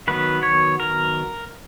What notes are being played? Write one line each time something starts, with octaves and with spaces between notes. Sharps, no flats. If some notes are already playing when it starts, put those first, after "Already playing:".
D#3 F#3 B3 B4
C#5
A#4